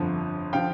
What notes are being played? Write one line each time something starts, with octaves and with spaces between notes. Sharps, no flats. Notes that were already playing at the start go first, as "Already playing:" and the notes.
Already playing: G1 F2 D3 F3
D3 F3 F5 G5